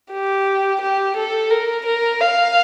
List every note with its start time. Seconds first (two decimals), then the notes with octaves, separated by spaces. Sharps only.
0.12 G4
0.81 G4
1.17 A4
1.51 A#4
1.86 A#4
2.21 F5